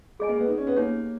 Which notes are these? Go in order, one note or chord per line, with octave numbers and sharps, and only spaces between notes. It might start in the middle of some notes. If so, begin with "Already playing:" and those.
G#3 G#4 D#5 G#5
A#3
B3
D#4
C#4
B3
A#3 D#4 G4 C#5